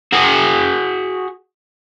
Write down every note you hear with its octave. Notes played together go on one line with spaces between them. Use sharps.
F#4 G#4